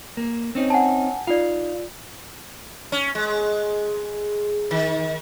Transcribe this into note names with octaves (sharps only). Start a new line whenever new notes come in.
A#3
C4 C#4 D#4
F#5 G#5 A5
D#4 F4 D5 F5
C#4
G#3
D#3